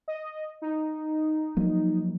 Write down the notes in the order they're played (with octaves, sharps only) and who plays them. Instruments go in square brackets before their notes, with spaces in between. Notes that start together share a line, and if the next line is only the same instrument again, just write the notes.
[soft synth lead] D#5
D#4
[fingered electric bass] F3 F#3 A#3